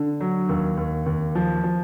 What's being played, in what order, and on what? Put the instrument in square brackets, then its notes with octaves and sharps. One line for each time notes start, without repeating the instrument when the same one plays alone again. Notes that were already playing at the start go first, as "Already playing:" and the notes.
Already playing: [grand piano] D3
F#3
D#2
D#2
D#2
F3
F3